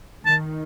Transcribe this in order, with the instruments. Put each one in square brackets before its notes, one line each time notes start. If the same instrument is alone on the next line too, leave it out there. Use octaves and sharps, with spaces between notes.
[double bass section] D#3 [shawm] A5